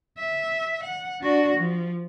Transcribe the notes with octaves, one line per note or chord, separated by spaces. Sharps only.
E5
F#5
D4 F#4
F3